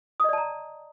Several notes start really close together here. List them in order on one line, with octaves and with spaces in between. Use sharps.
D#6 D#5 D5 A5 A#5